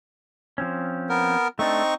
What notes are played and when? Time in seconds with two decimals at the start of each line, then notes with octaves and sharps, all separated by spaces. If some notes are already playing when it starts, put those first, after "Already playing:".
0.58 F3 C4 C#4
1.09 B3 A#4
1.59 A3 C4 D4 D#4 C#6